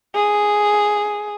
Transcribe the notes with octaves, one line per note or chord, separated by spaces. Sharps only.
G#4